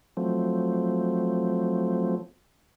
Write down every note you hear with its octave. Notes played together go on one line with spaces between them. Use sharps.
F3 F#3 A3 C4